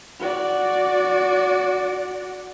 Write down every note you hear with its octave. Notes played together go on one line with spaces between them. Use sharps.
F#4 D5